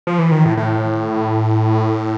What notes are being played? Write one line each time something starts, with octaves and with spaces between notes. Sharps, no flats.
F3
E3
D#3
A2
A2